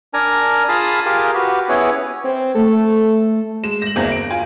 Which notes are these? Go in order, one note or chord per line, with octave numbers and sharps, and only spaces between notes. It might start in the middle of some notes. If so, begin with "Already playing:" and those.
D4 A#4 G#5 A#5
F4 G#4 F5 A5 B5 D#6
F4 G4 G#4 A#4
F#4 G4 B4
B3 C#4 E4 G#4 B4 C#5
C4
A3 A4
G#3 E7
A#6 F#7
G1 E2 A#3 C4 G#4
D7
F4 G#5